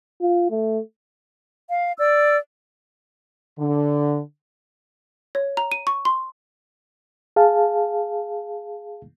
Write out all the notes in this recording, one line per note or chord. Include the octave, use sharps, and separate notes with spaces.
F4
A3
F5
D5 E6
D3
C#5
A#5
D#7
C#6
C6
G#4 F5 A5